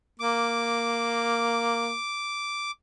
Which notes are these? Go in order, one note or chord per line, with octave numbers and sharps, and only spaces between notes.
A#3 D6